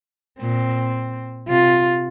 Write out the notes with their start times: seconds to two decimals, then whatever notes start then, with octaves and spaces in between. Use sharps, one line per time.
0.41 A#2 C4
1.48 C3 F4